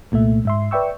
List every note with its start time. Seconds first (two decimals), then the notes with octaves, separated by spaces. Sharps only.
0.12 C2 A#2 A3 E5
0.45 G#2 E5 C6
0.71 B4 D5 E5 G5 C#6 E6